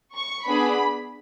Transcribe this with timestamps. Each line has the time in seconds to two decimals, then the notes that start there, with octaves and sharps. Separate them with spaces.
0.15 C#6
0.45 B3 D4 G#4 B5